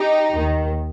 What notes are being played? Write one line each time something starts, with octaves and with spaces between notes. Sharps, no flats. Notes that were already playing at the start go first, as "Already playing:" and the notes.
Already playing: D#4 G4
D#2 D#3